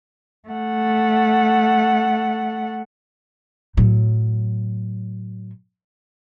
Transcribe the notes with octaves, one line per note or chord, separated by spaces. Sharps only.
A3 F#5
A2 F#3